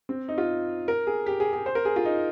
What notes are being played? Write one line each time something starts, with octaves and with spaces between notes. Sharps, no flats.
C4
D#4
F4
A#4
G#4
G4
G#4
G#4
C5
A#4
G#4
F4
D#4